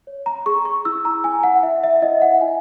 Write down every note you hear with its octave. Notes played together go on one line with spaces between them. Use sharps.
C#5
A#5
G#4 C#6
C#6
E4 E6
A#5
E4 G#5
F#5
E4 E5
E5
E4 D#5
F#5
E4 G#5